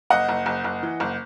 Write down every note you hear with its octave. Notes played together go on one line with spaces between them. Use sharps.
F#1 D#5 F#5
F#1
F#1
F#1
E3
F#1